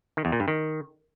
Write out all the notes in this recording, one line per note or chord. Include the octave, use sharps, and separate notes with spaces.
D#3
E2
A#2
G2
D#3